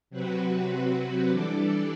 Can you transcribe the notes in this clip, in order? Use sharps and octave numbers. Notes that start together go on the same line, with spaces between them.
C3 F#3 C4 F#4 B4
E3 G3 D4 A4 D5